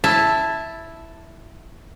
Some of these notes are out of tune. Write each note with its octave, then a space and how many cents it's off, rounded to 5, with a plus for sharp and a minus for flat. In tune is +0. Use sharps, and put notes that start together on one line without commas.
E4 +0 A5 +0